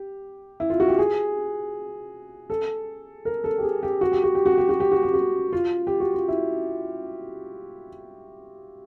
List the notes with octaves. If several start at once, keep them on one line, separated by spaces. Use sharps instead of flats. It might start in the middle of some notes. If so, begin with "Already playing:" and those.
Already playing: G4
E4
F4
F#4
G4
G#4
A4
A#4
A4
G4
G#4
G4
F#4
G4
F#4
G4
F#4
G4
F#4
G4
F#4
G4
F#4
F4
G4
F#4
F4
E4